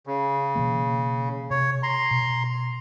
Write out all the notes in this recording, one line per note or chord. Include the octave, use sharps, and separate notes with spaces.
C#3
B2 E3 A#3
C3 C#5
A#5 C6
B2